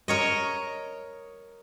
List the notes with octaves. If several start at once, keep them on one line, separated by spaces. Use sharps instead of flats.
A#4 C#5 D#5